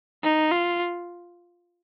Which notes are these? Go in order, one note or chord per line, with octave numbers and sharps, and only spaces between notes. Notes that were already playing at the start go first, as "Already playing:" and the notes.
D#4
F4